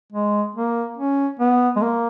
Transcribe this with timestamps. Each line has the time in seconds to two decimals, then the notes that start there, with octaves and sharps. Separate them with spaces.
0.13 G#3
0.55 A#3
0.98 C#4
1.40 B3
1.76 G#3
1.82 A#3